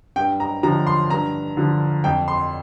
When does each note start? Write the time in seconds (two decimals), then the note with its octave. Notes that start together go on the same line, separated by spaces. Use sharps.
0.16 G2 G5
0.40 A#5
0.63 D3 F3 A#5
0.87 C6
1.10 G2 A#5
1.57 D3 F3
2.04 F2 G5
2.28 C6